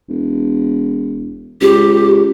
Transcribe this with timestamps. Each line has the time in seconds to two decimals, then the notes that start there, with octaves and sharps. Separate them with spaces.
0.09 E1
1.61 C#2 G4